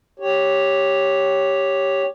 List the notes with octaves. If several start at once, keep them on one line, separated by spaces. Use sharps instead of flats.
G4 C#5